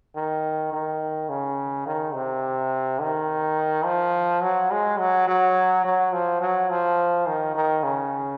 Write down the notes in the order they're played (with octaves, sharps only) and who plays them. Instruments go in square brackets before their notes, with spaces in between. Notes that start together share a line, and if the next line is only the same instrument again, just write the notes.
[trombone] D#3
D#3
C#3
D#3
C3
D#3
F3
F#3
G#3
F#3
F#3
F#3
F3
F#3
F3
D#3
D#3
C#3